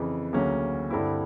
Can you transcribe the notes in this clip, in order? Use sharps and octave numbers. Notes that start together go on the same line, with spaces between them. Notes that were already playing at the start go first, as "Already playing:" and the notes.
Already playing: F2 C#3 E3
D2 C#3 F#3 A#3 C#4
G2 D3 G3 C4 E4